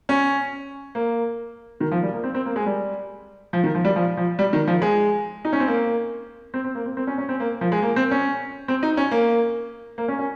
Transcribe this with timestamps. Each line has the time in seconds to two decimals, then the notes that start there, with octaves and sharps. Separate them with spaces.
0.09 C#4
0.95 A#3
1.80 D#3
1.91 F3
2.03 G3
2.13 A#3
2.24 C4
2.35 C4
2.46 A#3
2.56 G#3
2.66 G3
3.53 F3
3.64 D#3
3.75 F3
3.85 G3
3.96 F3
4.17 F3
4.39 G3
4.53 D#3
4.67 F3
4.82 G#3
5.45 D#4
5.53 C#4
5.60 C4
5.68 A#3
6.54 C4
6.64 C4
6.75 A#3
6.86 C4
6.97 C4
7.07 C#4
7.18 C#4
7.29 C4
7.40 A#3
7.61 F3
7.72 G#3
7.82 A#3
7.96 C4
8.11 C#4
8.68 C4
8.83 D#4
8.97 C#4
9.11 A#3
9.98 A#3
10.08 C#4
10.19 C#4